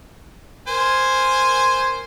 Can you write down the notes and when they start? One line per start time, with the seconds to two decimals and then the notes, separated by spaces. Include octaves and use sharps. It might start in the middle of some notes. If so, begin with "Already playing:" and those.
0.68 A#4 C5 G#5